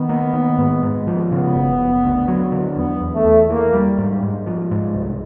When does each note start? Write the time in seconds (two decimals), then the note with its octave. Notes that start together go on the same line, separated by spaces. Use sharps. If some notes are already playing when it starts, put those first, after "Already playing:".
Already playing: D#3 B3
0.09 A#3
0.34 D#3
0.58 G#2
0.83 G#2
1.07 F3
1.32 C#3 B3
1.55 F#1
1.79 F#1
2.04 D2
2.28 F#3
2.52 D3
2.76 E2 B3
3.01 E2
3.13 A3
3.25 E2
3.49 E3 A#3
3.73 G3
3.98 G#2
4.23 G#2
4.46 F3
4.71 G#2
4.95 C2